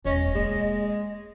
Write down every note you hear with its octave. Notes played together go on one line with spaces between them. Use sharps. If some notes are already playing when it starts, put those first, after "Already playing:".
E1 C#4 D#5
G#3 A#3